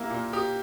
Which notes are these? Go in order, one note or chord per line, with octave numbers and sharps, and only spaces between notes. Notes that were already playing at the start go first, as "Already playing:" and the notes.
Already playing: A#3 E4 G4
A#2
G4